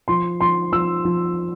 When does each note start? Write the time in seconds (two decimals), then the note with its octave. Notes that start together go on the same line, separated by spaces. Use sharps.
0.08 F3 C6
0.41 F3 C6
0.72 F3 E6
1.05 F3